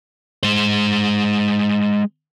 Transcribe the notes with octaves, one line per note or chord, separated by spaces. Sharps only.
G#3 C5